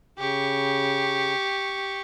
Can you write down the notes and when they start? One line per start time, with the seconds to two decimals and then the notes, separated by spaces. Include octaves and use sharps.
0.18 C#3 G4 C#6